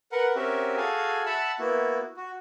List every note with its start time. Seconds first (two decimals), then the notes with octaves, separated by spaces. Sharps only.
0.12 A#4 B4 F#5
0.35 C4 C#4 F#4 G4 A#4 E5
0.77 F#4 G#4 A4 F5 G#5
1.26 E5 F#5 A5 B5 E6
1.59 A#3 B3 E4 F#4
2.17 F#4